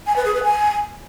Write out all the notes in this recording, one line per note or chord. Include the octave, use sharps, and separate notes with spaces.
G#5
B4
G#4
B4
G#5